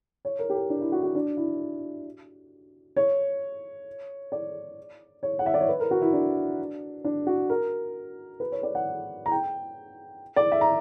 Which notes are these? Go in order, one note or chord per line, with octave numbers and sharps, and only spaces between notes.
C#5
A#4
G4
A#4
D4
E4
F#4
F#4
D4
E4
C#5
D5
C#5
F#5
E5
D5
C#5
B4
A#4
F#4
E4
D4
D4
F#4
A#4
B4
C#5
D5
F#5
A#5
G5
D5
E5
A#5